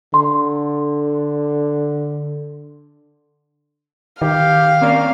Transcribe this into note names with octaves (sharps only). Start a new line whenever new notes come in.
D3 C6
D#3 G4 F5
A#3 C4 C#4 D5